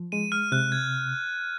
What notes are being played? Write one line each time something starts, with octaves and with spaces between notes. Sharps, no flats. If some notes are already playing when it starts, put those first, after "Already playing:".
Already playing: F3
G#3 D#7
F6
C3 F#6
G#6